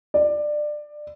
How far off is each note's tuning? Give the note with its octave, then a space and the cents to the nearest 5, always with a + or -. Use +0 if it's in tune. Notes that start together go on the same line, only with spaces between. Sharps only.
D5 +20